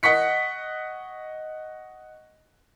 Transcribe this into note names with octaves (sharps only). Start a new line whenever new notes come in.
D#5 F#5 C#6 B6 C#7